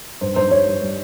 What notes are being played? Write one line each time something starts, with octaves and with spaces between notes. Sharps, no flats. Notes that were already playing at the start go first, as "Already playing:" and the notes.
G2 C5
G2 C5
G3 C#5
G3
G3